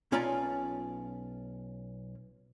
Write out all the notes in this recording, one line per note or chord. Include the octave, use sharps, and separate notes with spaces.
B1 C#4 F4 D5 G#5 A#5